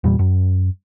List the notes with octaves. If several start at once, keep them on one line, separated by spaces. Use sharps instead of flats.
E2 A#2 G3
F#2